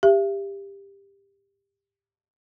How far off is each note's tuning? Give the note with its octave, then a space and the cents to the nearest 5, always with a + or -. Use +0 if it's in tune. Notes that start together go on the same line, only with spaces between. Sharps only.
G4 +20 E5 +40